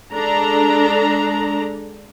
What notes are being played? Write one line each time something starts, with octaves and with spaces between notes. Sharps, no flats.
G#3 D4 A4 A#5